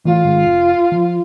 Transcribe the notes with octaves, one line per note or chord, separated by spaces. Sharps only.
E3 A3 F4
G#2 D#3 G#3
F1
F3